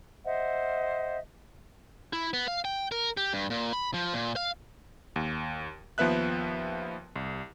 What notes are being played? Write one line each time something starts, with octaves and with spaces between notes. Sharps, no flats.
C5 D#5 E5 F#5
E4
B3
F5
G5
A#4
G4
G2
A#2
B5
F3
A#2
F5
D#2
D#2 F3 B3 B4 E5 F#6
C2